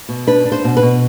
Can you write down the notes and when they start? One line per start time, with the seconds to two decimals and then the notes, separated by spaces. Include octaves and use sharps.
0.09 B2
0.27 D4 B4
0.45 D4
0.52 C5
0.64 B2
0.77 B4
0.83 B2